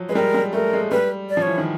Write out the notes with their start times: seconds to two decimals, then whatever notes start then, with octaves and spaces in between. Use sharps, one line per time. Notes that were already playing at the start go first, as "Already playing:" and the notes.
Already playing: F3 F#3
0.09 G#3 B4
0.15 G3 A#4
0.34 G3
0.53 A3 A#4
0.73 G#3
0.91 G3 B4
1.30 D5
1.37 F3
1.42 E3 C#5
1.58 D#3